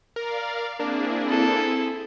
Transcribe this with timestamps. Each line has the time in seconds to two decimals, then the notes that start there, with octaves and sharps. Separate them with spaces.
0.16 A#4 D5 F5
0.79 A#3 C4 D4 E4 G#4
1.30 A4